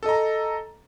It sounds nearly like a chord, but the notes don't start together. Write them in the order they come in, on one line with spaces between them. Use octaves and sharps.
A4 D#5 A#5